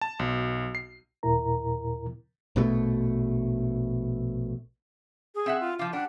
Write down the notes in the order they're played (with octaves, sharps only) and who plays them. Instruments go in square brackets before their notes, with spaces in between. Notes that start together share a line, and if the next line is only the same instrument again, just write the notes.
[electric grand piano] A5
B1
C7
[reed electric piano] D#2 A#2 E4 A#4 A#5
[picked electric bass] A#1 B2 D#3 A3
[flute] G#4
[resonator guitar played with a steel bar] C4 E5 F#5
[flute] F4
[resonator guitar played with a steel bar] F3 F4 [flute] D6
[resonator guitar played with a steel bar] G3 D4 [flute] F#5